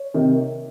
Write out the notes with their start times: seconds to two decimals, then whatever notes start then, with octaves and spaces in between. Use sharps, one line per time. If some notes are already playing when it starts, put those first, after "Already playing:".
Already playing: C#5
0.14 C3 D#3